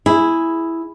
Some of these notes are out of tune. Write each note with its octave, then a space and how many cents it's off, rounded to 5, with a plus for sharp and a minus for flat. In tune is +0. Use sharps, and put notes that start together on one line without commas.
E4 +0 G#4 +0